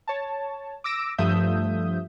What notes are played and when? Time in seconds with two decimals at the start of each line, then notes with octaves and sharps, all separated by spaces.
0.08 C#5 A5
0.84 D6 E6 A#6 D7
1.18 G2 F3 A3 E5 D#6 G6